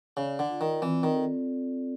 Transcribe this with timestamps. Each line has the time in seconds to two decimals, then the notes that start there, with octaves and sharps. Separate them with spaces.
0.17 C#3 D5
0.39 D3
0.50 F4
0.61 D#3
0.82 E3 C4
1.03 D#3
1.14 A4